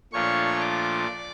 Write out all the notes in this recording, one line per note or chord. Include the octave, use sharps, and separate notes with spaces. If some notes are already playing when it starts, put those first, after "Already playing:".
A#2 F3 A3 D4 F4 C#5 C#6
D5 D6